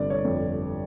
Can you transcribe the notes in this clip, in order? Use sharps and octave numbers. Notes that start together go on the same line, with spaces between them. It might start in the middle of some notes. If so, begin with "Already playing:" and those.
Already playing: G1 C3 D5
C#5
F2